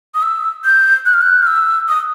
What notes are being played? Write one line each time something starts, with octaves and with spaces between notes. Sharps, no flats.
D#6
E6
G6
F#6
F6
F#6
F6
E6
D#6